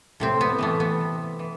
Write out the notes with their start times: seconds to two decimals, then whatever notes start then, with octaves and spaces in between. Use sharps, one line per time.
0.20 A2 C3 C4
0.41 B3
0.59 E3 G3 A3
0.80 B3
1.00 C3
1.39 E3